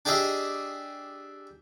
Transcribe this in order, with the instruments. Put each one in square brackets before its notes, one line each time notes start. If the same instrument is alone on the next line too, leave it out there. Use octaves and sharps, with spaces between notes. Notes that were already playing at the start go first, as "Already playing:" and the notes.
[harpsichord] D4 G4 G#4 D#5 E5